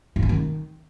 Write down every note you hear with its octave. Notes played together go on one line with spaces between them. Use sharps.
G#2
C#4
D#3